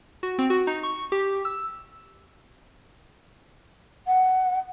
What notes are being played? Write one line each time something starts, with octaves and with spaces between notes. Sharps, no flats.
F#4
C4
F#4
D#4
C#6
G4
E6
F#5